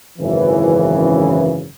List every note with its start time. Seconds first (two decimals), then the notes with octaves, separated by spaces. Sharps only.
0.19 G#1 F#2 C#3 E3